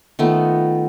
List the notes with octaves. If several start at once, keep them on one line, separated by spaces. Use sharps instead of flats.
D#3 A3 B3 F4